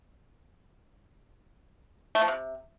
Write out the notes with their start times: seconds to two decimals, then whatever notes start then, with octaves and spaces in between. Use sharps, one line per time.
2.15 A3
2.21 F3
2.28 C3